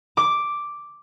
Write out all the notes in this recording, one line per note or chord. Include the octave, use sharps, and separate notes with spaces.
D6